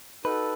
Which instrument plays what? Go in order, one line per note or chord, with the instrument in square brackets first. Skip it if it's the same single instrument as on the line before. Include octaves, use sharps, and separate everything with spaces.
[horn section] D#4 F#4 A4 [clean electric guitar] B4